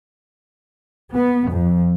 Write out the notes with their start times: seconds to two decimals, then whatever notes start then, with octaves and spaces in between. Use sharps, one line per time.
1.17 B3
1.51 F2